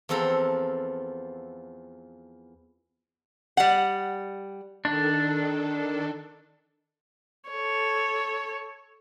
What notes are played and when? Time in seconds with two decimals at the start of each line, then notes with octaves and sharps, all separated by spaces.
0.09 E2 F3 C4 A4 A#5
3.57 G3 F#5
4.85 D#3 D4 A4
7.49 A4 C#5